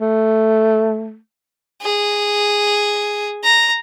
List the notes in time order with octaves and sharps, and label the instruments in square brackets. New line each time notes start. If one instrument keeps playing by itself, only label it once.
[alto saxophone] A3
[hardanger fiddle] G#4
A#5